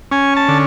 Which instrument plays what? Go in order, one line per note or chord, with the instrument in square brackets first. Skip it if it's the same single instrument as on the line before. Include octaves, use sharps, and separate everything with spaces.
[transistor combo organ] C#4 G#5
A5
D3